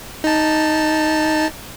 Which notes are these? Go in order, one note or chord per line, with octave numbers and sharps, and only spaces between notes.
D#4 A5